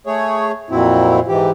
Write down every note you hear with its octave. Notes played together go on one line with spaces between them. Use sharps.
A3 G#4 C#5
F2 A#2 F#3 C4 E4
G#2 E3 G4